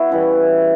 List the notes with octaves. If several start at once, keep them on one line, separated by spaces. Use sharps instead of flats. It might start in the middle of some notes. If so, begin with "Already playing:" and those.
Already playing: B3 E4 F#4
C#3 E3 G3